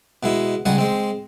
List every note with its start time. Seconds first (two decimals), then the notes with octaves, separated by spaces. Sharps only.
0.23 B2 G#3 E4
0.65 C#2 G3 G#3 F#5 G#5
0.78 G#3 C4